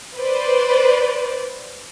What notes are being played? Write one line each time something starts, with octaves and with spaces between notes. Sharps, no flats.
B4 C5 D5